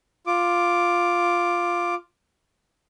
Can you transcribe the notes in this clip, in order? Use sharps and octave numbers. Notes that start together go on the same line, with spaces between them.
F4 D6